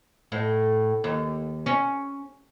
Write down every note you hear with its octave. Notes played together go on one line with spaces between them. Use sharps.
A2
D#2
C#4